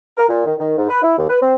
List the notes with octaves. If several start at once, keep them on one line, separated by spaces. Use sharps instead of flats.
A#4
A#2
D#3
D#3
G#2
B4
E4
D#2
B4
C4